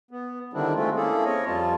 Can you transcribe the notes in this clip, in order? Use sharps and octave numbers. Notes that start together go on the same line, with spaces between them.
B3
D3 D#3 G3 C4 D4 E4
G#3 A3 C4 F4
A#3 C#4 E4 G#4 A4
C4 C#5 D#5
F2 G3 F4 A5